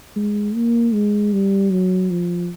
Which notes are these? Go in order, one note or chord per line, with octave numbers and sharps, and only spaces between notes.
G#3
A#3
G#3
G3
F#3
F3